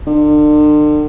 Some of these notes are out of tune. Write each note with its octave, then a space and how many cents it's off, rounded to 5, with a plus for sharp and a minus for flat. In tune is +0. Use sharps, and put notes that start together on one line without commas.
D3 +40